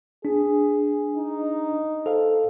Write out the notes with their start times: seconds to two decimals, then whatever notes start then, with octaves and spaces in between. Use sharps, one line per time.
0.25 D4 G#4
1.16 D#4
2.06 A4 C5 F5